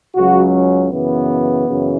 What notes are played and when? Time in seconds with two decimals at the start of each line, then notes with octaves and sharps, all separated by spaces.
0.15 C#2 C#3 F#3 F#4
0.53 C#4
0.92 F#2 C#3 E3 B3
1.68 F#2 C#3 E3